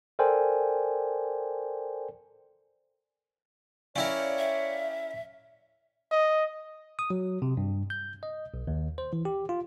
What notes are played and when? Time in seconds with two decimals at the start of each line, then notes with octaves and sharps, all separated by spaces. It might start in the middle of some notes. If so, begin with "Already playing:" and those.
0.19 A4 A#4 C5 D5 G5 G#5
3.96 C#4 E4 A#4 C#5 D5 F5 G5
4.39 E5
6.11 D#5
6.99 D#6
7.10 F#3
7.42 C3
7.57 G2
7.90 G6
8.23 D#5
8.54 B1
8.67 D#2
8.98 C5
9.13 E3
9.25 G4
9.49 F4